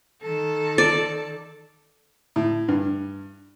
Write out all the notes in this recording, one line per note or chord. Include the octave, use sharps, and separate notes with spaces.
D#3 A4
D5
A2
G2